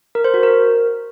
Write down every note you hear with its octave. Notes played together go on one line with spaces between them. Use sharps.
A#4
C5
F#4
A#4